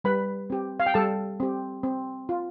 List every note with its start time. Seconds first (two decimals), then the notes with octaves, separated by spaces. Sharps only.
0.04 G3 B4 B5
0.50 C4 G4
0.80 F5
0.86 G5
0.94 G3 A4 A5
1.40 C4 G4
1.83 C4
2.29 F4